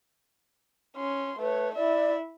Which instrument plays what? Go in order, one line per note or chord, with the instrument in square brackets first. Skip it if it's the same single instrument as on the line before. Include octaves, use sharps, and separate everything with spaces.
[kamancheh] C#4 C6
[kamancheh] A3 C#5 [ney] B4
[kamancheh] E4 E5 [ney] D5